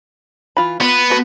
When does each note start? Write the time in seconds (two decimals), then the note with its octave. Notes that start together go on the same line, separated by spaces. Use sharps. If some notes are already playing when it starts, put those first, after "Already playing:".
0.57 E3 F4 B5
0.81 B3 F4
1.10 A3 F#4 B4